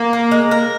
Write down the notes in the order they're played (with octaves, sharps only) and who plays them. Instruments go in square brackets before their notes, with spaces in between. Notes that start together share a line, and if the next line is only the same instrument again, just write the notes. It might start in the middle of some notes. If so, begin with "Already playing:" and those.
Already playing: [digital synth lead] A#3
[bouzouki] A#4
G#3
A#4